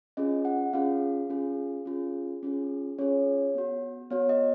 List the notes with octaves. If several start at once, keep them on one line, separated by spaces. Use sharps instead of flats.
C#4 F4 G#4 D#5
F#5
C#4 F4 G#4 F5
C#4 F4 G#4
C#4 F4 G#4
C#4 F4 G#4
C#4 F4 G#4 C#5
B3 F#4
B3 F#4 C#5
D#5